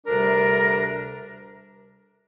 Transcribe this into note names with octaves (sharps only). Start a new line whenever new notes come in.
D2 C3 G3 D4 A#4